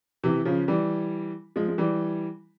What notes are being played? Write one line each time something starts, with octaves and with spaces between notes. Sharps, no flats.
C3 E3
C#3 F3
E3 G3
F3 G#3
G#3
E3 G3